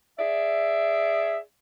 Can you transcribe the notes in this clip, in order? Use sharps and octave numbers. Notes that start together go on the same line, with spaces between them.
G#4 D5 E5